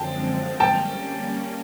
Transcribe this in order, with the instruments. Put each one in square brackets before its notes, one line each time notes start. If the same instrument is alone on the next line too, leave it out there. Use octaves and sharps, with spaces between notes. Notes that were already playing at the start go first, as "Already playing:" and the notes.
Already playing: [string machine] F#2 D3 F3 G#3 C4 [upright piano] G5 A5
[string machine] G3 A#3 C#4 [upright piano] G5 A5